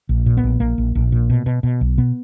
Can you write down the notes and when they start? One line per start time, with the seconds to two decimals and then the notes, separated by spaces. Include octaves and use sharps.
0.09 A#1
0.26 A#2
0.37 B3
0.43 A#1
0.60 A#1 A#3
0.78 A#1
0.95 A#1
1.12 A#2
1.30 B2
1.46 B2
1.63 B2
1.81 B1
1.98 B2 B3